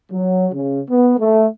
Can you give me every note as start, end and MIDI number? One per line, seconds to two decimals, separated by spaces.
0.12 0.47 54
0.52 0.80 49
0.89 1.14 59
1.19 1.46 57